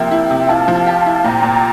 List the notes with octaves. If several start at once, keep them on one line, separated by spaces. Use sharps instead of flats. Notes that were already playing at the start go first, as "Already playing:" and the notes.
Already playing: C3 F3 A#3 E5 G5
E4
C3
E4 F5 A5
F3
G4
E4
A#2 G5 A#5
A#2